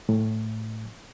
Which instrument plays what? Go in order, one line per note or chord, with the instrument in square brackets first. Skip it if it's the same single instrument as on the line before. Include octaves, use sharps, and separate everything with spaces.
[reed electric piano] A2